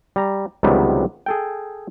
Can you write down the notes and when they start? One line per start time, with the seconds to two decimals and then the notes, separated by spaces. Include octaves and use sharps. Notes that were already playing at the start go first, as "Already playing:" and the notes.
0.16 G3 A#5
0.63 C#2 C3 D#3 F#3 G3 B3
1.26 G#4 A4 G5